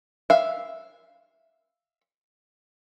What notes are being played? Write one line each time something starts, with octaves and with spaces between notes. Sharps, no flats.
E5 F5